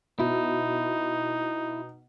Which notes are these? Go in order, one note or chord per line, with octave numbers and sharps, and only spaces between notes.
B2 D#4 E4